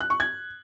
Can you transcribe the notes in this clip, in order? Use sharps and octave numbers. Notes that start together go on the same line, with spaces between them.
F#6
C#6
G#6